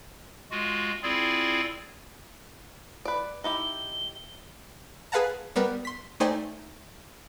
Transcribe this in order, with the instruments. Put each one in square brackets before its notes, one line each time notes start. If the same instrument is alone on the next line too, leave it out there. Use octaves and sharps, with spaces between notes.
[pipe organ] G#3 F4 F#4
C4 E4 F4 G#4 D5
[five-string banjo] B4 D5
[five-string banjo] D#4 E4 G4 [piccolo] G7
[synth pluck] G#4 B4 F5 F#5 A5 A#5
G3 B3 A#4 B4
C6 B6
A3 D#4 C5 D5 G5 G#5